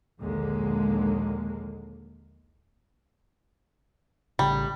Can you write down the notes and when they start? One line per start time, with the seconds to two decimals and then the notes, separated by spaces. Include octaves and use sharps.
0.20 A#1 D#2 D3 G#3 A#3
4.39 A1 C#3 G3